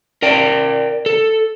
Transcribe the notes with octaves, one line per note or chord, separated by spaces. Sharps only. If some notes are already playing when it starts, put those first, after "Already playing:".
A#4 D5 G5
A4